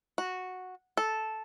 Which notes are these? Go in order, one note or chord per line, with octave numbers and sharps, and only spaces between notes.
F#4
A4